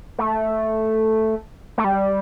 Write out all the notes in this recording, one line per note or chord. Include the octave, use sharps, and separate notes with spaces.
A3
A3
G3